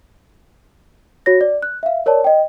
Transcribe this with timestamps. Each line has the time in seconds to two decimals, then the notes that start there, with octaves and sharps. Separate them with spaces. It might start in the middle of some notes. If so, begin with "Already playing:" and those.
1.26 F#4 C#5 A#6
1.41 D5
1.62 F#6
1.83 E5 F5
2.06 A#4 C#5 D5 A5
2.24 D#5 G5